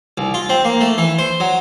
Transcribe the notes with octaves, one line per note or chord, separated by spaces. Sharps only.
C2
F4
C4
A#3
A3
E3
C5
F#3